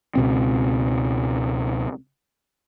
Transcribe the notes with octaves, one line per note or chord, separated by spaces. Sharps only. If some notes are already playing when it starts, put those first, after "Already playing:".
C#2 B2 C4